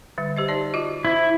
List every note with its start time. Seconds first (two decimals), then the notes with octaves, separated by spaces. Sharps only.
0.18 D3 G3
0.36 G4 C5 D#5
0.48 D#4 D5 A5
0.74 F4 F#4 D#5
1.05 E4 C5